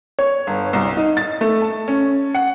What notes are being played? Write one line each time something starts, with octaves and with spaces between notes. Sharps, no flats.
C#5
G1
C2
D#4
A6
A3
A5
C#4
F#5